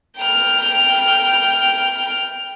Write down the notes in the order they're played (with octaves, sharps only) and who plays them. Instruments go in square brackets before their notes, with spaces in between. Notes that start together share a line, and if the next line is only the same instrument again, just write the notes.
[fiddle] G5 F6